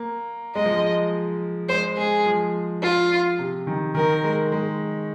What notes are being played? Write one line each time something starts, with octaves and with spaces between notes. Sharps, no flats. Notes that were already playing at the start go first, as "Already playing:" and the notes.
Already playing: A#3
G#3 D#5
F3
G#3
G#3 C5
G#3 G#4
F3
F4
C3
D#3
D#3 A#4
G#3
G#3